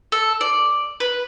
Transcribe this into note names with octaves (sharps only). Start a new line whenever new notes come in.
A4
D5
B4